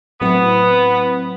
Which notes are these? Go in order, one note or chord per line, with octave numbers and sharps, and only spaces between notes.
A2 F#3 B3 C4 E4 B4